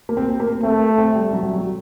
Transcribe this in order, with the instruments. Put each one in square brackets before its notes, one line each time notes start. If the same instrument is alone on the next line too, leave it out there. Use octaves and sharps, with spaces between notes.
[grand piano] A#3
C4
A#3
[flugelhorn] A3 [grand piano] C4
[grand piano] C4
G3
F#3
G3
F#3